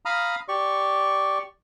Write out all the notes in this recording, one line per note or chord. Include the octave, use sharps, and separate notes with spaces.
F5 A#5 B5 D#6 F6
G4 D5 C#6